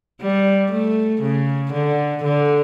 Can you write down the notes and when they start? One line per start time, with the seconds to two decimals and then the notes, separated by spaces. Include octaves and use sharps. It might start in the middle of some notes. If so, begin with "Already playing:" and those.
0.22 G3
0.72 A3
1.22 C#3
1.72 D3
2.24 D3